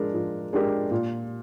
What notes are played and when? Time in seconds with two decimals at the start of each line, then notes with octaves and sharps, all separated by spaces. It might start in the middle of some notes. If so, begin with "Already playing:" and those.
Already playing: F3 G#3 D4 A#4
0.14 F3
0.53 G#3 D4 G4 A#4
0.91 A#2